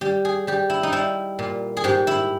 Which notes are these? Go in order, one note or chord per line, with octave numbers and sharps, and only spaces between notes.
G3 G4
G#4
G3 G4
E4
D#4
G3 E4
A#2
G#4
G#2 G4
E4